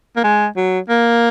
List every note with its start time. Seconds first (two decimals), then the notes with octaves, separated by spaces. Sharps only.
0.16 A#3
0.24 G#3
0.57 F#3
0.89 A#3